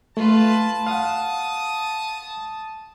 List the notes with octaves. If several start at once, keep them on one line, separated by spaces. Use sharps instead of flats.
A3 F4 B4 A5
F5 F#5 D#6